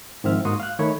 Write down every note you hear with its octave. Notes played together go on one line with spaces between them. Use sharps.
G#2 D#3 F3 C4 E5 F6
G#2 A#3 F#4 C6 C#6 D#6
F5 F#6
D#3 A3 C#5 B5